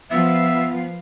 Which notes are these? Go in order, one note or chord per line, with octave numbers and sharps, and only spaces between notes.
F3 B3 B4 E5 F5